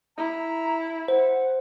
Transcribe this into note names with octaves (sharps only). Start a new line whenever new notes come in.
E4 A#5
C5 F#5